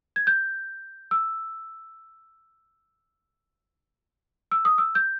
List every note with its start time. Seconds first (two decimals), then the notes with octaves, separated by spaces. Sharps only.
0.16 G#6
0.27 G6
1.11 E6
4.51 E6
4.65 D#6
4.78 E6
4.95 G6